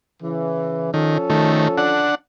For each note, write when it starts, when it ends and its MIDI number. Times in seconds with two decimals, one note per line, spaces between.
0.23 0.91 49
0.23 0.91 52
0.94 1.18 51
0.94 2.14 53
0.94 2.14 61
0.94 2.14 69
1.30 1.68 51
1.30 1.68 57
1.78 2.15 62
1.78 2.15 78